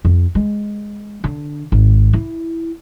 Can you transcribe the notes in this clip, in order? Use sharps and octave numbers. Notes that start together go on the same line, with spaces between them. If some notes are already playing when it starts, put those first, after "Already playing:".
F2
G#3
D3
G#1
E4